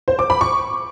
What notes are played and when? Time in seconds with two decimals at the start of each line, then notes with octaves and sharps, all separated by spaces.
0.08 C5
0.19 D6
0.30 B5
0.41 C#6